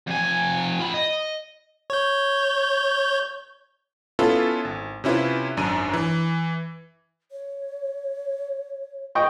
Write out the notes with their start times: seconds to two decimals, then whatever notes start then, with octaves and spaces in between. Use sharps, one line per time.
0.07 F2 G#5
0.79 F4 B5
0.94 D#5
1.90 C#5 G6
4.19 B3 C#4 E4 F4 A4 B4
4.65 G#1
5.04 C3 C#4 E4 F4 B4
5.57 G#1 F#2 D4 D#7
5.93 E3
7.32 C#5
9.15 D#5 G5 C#6